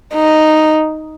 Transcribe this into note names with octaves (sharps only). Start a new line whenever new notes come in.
D#4